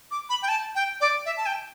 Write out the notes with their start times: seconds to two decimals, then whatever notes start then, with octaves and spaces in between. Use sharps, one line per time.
0.11 D6
0.29 B5
0.42 G5
0.49 A5
0.75 G5
1.01 D5
1.26 E5
1.37 A5
1.46 G5